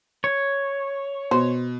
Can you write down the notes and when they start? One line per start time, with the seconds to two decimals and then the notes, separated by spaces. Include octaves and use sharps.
0.24 C#5
1.31 B2 C5